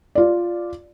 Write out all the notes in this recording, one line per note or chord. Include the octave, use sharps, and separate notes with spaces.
F4 D5